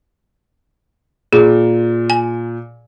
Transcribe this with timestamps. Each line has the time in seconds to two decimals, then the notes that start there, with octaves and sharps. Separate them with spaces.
1.33 A#2 G#4
2.10 G#5